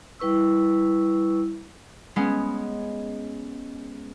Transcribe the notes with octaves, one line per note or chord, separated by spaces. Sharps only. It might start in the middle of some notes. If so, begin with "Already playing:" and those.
G3 E4 B4 C#6 E6
G#3 B3 C#4